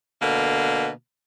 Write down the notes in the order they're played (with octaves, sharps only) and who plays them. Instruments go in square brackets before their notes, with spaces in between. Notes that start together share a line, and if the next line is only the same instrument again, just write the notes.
[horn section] B2 D3 A#3